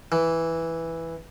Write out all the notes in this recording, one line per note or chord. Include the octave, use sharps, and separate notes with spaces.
E3